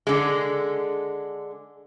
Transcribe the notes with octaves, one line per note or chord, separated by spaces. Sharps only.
D3 G#3